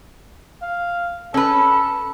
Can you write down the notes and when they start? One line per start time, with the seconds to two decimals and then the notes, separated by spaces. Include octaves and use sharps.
0.62 F5
1.34 C#4 A4 B4